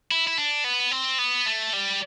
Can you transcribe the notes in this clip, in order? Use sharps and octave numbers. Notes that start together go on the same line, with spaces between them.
E4
E4
D4
B3
C4
B3
A3
G3